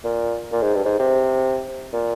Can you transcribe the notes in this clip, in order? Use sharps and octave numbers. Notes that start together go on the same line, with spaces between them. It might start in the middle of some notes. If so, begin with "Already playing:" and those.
A#2
A#2
G#2
G2
G#2
C3
A#2